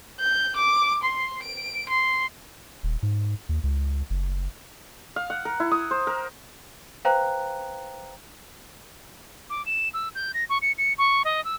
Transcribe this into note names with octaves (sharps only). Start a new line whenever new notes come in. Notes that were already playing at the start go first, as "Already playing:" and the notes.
G6
D6
C6
D7
C6
D#1
G#2
D#2
C#2
F#1
F5
F#5
A#4
E4
D#6
C5
A#4
B4 C5 F5 G5 A#5 F#6
D6
E7
E6
G6
A#6
C#6
C#7
C#7
C#6
D#5
E6